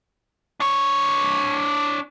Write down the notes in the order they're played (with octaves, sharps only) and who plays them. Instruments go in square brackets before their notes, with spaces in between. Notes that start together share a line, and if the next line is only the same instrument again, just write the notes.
[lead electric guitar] D4 C#5